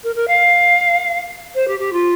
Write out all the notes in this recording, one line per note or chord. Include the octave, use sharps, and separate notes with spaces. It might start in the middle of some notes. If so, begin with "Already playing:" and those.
A#4
A#4
F5
C5
G4
G4
F4